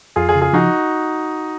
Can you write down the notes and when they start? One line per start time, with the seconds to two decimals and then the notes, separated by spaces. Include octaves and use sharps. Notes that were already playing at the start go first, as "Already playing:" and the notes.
0.16 F2 F4 G#4
0.29 F4 G#4
0.35 C#3
0.41 F4 G#4
0.53 F3 D#4 F#4